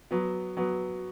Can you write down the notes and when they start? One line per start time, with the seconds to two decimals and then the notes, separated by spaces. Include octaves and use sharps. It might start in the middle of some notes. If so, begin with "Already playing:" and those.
0.11 F#3 B3
0.57 F#3 B3